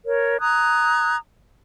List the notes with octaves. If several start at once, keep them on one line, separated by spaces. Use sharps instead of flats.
A#4 C#5
A#5 D#6 F#6 G#6